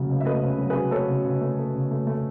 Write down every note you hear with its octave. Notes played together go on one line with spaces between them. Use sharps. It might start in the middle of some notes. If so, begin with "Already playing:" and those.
Already playing: C#3 F#3 A3
C#2
E5
A3 B4 D#5
C#3
F#3
G#4 B4
F#3
A3 A4 C#5
C#3
C#3
A3
A3
C#3
A3
A3